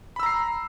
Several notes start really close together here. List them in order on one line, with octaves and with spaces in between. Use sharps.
B5 E6 A#5 C7